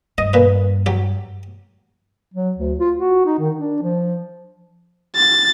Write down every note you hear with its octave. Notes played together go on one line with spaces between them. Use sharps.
G2 D#5
A#2 B4
F#3 G4
F#3
D2
F4
F#4
D#4
D#3
D4
F3
A6